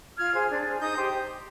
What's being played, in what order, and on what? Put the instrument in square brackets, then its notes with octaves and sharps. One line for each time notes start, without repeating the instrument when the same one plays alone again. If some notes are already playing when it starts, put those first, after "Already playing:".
[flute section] F4 F6 G#6
G#4 C5
D4
G#4 C5
D#4 D#6 G6
G4 C5